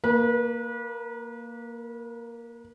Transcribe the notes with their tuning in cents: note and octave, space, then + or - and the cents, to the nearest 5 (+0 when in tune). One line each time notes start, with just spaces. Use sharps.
A#3 +0 B4 -35